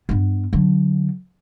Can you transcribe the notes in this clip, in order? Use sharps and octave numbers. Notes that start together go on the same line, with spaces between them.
G2 B3
D3 F#3